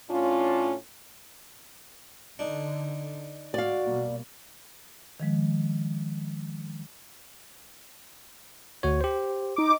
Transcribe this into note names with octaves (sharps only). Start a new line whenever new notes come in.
A2 C#4 D4 F4
D3 D4 D#4
G#2 F#4 D5 F5
B2 G3 A#3
D#3 F3 G#3
D2 F#4 C#5
G4 C5
D#4 D6